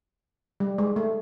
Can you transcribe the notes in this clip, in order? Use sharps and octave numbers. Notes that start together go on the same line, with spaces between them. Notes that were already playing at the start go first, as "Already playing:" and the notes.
G3
G#3
A3